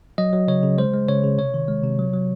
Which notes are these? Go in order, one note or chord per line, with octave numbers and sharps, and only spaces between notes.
F#3 D#5
F#3
C#3 C#5
C#3
G#3 C5
G#3
C#3 C#5
C#3
C3 C#5
D#3
G#3
C3
F#3
F#3